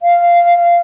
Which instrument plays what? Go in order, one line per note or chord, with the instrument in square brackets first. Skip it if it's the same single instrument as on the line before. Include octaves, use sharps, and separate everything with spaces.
[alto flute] F5